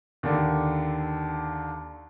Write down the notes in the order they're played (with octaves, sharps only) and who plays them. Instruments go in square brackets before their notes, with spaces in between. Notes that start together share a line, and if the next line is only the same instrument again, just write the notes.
[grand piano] D#2 D3